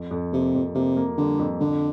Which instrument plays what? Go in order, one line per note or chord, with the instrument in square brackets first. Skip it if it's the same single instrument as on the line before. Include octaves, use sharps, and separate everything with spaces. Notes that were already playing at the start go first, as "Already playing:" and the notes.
Already playing: [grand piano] F2
F2
[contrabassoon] C3 [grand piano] A#3
[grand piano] F2
[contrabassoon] C3 [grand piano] A#3
[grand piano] A#3
[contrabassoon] D3 [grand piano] G3
[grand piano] F2
[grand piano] F2 [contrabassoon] D3